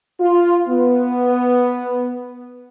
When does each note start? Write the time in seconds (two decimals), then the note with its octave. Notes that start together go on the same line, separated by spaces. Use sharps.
0.20 F4
0.67 B3